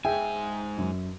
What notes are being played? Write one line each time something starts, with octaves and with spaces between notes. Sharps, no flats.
G#2 G#4 E5 G5 G#5
F#2